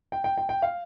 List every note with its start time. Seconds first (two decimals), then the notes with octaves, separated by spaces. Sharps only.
0.12 G5
0.24 G5
0.38 G5
0.49 G5
0.62 F5